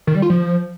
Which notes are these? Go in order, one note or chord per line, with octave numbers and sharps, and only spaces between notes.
D#3
G3
F4
F3